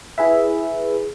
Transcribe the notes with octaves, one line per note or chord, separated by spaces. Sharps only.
E4 G#4 B4 E5